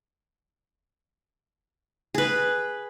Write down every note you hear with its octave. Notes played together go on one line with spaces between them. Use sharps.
G#4 B4